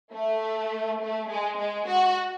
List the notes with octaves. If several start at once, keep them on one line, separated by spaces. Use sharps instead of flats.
A3
A3
G#3
G#3
F#4